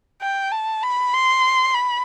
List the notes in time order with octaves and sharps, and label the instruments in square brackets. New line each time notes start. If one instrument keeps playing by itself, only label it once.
[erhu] G5
A5
B5
C6
B5